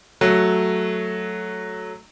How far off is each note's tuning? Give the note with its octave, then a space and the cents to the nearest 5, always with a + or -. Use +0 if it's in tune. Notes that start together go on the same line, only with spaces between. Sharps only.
F#3 +0 A3 +0